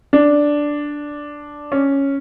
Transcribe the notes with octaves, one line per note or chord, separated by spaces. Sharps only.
D4
C#4